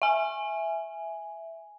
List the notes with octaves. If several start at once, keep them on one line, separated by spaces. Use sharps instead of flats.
E5 G#5